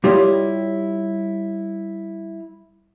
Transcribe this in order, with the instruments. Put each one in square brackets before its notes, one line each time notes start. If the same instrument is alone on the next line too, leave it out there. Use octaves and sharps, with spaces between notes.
[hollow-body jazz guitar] G3 E4 F4 G4 C#5 D#5